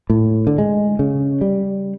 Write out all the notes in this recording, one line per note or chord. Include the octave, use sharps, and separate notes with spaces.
A2
D3
G#3
C#3
G3